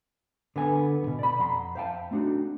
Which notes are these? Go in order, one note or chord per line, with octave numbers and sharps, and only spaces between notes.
D3 B3 G#5
E2 B2
D5 B5
F2 F#5 A#5 C6
C5 E5 F5 G5 A5
A3 C4 D4 D#4 F#4